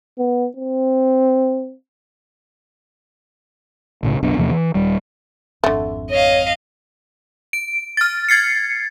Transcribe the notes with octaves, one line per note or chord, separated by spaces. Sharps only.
B3
C4
B1 A2 C#3
F#1 B1 B3 D4
E2 C3 F3 A#3
E3
D#1 G3
G#1 F2 D3 A3
C#5 D#5 F5
D7
F6 A6
G#6 A6 C7 C#7